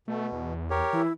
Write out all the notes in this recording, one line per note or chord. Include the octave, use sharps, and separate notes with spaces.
B2 A3
E2
G4 A#4 C#5
E3 E4